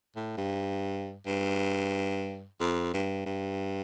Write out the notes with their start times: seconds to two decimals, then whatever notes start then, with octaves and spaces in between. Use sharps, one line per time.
0.16 A2
0.38 G2
1.26 G2
2.60 F2
2.93 G2
3.26 G2